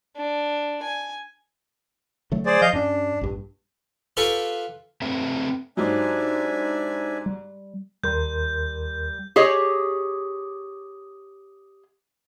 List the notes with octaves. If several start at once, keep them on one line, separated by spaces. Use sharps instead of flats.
D4
G#5
D3 F#3 A3
G#4 C5 D5
F3 D#5 F5 G6
G2 C#4 D4
A#1 G2
F4 G4 A4 B4 C#6
A3 C4 B4 E5
G#2 F#3 D4 D#4 G4 C5 E5 G#5
G3
D#2 G3 A#4 C6 G6
G4 G#4 C#5 D#5